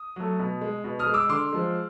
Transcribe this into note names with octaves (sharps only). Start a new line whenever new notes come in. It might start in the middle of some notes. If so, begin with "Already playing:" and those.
Already playing: D#6
F#3 A3
B2
G#3
B2
D#6 F6
G#3
D6 E6
D3 C6 D6
F3 G#3